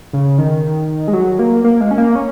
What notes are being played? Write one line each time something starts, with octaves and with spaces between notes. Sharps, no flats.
C#3
D#3
G#3
F#3
A#3
A#3
G#3
C#4
A#3
C#4